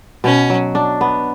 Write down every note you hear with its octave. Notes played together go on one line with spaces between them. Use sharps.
B2 C#4
F#3
D4
B3